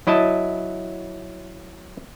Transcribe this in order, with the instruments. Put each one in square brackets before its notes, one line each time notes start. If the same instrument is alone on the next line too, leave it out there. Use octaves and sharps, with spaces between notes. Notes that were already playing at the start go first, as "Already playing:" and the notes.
[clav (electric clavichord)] F#3 E4 D#5 A5